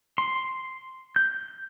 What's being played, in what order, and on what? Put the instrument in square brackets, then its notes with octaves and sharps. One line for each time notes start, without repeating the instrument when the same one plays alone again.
[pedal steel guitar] C6
G6